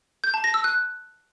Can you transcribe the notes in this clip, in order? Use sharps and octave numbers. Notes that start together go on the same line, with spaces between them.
G6
A5
A#6
E6
F#6